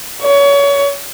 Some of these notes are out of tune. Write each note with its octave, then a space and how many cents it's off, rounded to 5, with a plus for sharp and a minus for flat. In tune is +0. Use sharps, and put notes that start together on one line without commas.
C#5 +25